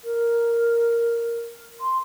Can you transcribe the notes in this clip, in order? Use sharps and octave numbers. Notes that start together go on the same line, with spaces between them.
A#4
C6